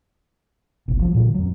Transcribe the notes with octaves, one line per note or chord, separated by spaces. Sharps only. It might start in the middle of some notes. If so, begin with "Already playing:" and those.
G1 C2 B2
F3 F#3
A#2 D3 D#3 F#3
F2 F#3